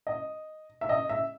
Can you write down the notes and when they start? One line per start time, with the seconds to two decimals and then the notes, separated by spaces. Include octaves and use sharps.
0.07 D#5
0.81 E5
0.89 D#5
1.09 E5